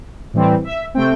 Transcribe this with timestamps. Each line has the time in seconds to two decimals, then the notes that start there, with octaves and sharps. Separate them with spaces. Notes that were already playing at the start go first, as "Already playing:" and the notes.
0.34 A2 E3 G3 C4
0.64 E5
0.94 C3 A3 C4 G5